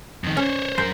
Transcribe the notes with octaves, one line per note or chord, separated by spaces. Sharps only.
F2 D#3
C#4 C5 C#5
F#2 A#4 C5